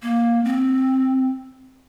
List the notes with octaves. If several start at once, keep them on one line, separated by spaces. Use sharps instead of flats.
A#3
C4